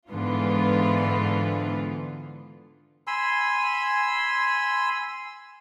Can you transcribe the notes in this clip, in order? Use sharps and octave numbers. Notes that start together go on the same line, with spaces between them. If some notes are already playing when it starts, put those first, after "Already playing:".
G#2 D3 E3 B3 F4
G#5 B5 C6 E6